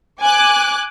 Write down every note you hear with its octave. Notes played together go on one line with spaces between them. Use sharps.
G#5 D6 F#6